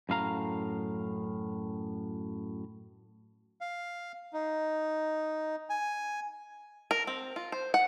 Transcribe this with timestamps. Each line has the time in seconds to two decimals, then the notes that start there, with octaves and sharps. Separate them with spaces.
0.09 F#2 A2 F5 A#5
3.61 F5
4.33 D#4
5.70 G#5
6.91 A#4
7.07 C4
7.36 F4
7.52 C5
7.74 F#5